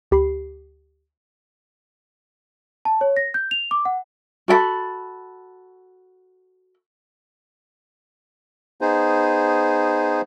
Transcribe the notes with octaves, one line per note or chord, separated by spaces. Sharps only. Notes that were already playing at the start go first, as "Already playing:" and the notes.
D2 G4 B5 C7
A5
C#5
A#6
G6
F7
D6
F#5
F#4 A4 G5 B5
B3 D#4 G#4 C5